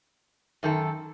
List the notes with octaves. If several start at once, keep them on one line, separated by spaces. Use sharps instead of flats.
F#2 D#3 A4